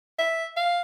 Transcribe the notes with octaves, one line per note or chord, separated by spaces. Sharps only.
E5
F5